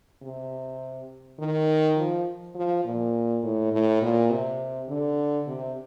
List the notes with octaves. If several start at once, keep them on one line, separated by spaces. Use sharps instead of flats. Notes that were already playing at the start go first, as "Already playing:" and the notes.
C3
D#3
F3
F3
A#2
A2
A2
A#2
C3
D3
C3